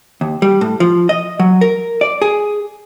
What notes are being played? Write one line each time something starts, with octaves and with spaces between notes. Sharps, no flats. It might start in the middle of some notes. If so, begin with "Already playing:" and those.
D#2
G3
A2
F3
D#5
F#3
A#4
D5
G#4